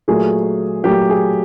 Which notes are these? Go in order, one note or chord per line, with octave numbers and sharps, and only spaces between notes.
A#2 F#3 A3 G#4
A#2 F#3 A3 G4
G#4